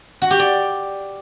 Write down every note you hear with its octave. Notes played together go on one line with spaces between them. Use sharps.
F#4
G4
D5